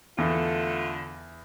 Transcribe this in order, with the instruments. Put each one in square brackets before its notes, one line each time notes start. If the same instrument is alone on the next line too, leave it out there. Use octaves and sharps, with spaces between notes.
[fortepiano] E2 [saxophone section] D3 A3 F4